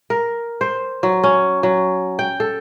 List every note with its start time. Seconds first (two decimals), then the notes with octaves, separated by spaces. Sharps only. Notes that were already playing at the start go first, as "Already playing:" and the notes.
0.10 A#4
0.61 C5
1.03 F#3
1.23 C#4
1.63 F#3
2.19 G5
2.40 A4